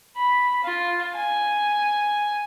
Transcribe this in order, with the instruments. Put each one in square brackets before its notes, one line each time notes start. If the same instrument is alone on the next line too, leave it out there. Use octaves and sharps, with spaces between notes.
[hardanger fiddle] B5
F4
G#5